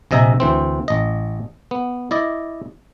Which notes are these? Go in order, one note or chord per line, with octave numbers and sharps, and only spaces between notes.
A#1 C3 D#5 E5 G#5 A#5
D2 E3 C4
A1 D#5
B3
E4 D5 D#5